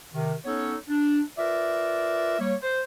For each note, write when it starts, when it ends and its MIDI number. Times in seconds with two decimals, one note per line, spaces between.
0.14 0.33 48
0.14 0.33 51
0.45 0.75 59
0.45 0.75 61
0.45 0.75 63
0.45 0.75 69
0.45 0.75 73
0.89 1.21 62
1.38 2.38 65
1.38 2.38 70
1.38 2.38 71
1.38 2.38 74
1.38 2.38 76
2.39 2.54 55
2.39 2.54 58
2.39 2.54 73
2.63 2.83 72